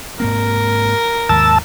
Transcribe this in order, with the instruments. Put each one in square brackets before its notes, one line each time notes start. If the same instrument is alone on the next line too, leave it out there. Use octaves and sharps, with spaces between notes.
[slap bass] G#2 A#3 C4 [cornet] A#4
[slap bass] D#2 G#2 D#3 [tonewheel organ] A5 E6